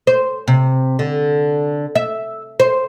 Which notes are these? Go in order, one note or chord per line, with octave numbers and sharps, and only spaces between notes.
C5
C3
D3
E5
C5